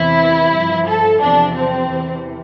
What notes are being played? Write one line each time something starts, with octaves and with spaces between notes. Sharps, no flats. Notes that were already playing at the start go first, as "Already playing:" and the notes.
Already playing: E2 C3 E3 E4
G2 F3
A4
E2 C3 F3 D4
C4
E2 C3 E3